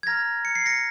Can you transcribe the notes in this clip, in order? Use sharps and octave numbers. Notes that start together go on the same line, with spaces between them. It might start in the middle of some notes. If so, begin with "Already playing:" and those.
G#6
A#5 F6 A#6
C#7
C7
A#6 C#7